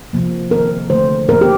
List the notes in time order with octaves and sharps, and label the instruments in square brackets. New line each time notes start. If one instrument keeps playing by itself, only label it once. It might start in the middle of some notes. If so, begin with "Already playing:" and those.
[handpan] C3 F3 A#3
C3 D#3 A#3 A#4
D3 F3 A3 C5
A#2 F3 A#3 A#4
G4